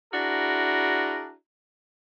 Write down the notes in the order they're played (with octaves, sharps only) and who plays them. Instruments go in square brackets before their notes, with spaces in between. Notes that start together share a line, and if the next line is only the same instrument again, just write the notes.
[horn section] D4 E4 F#4 G#4 A#4